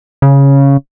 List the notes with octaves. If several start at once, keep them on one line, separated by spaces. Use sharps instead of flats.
C#3